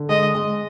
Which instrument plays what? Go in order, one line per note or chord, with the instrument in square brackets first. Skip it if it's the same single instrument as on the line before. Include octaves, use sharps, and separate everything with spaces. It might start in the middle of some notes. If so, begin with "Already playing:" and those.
Already playing: [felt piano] D3
[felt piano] G#3 [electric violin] D#5
[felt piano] G#3